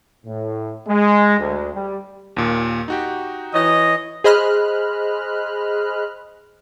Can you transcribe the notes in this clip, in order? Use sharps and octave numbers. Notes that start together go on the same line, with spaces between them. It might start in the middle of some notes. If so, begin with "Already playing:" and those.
A2
G#3
D2
G3
D#2 A#2
D#4 F#4 G4
E3 C#5 D#5
G#4 C5 D#5 B5 F6 F#6